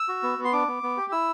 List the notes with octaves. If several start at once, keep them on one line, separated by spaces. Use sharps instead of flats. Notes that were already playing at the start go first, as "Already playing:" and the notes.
Already playing: E6
F#4
B3
B3
C6
D4 D6
B3
B3
G4
E4 E6